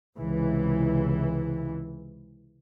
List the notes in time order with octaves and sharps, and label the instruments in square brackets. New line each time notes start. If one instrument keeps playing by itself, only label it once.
[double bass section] C#2 C3 E3